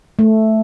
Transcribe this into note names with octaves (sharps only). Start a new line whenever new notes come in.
A3